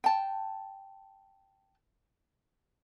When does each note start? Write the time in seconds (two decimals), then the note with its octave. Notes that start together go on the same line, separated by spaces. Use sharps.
0.04 G5 A5